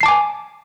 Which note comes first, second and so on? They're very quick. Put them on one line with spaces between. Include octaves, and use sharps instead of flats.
C7 A5 D6 G#5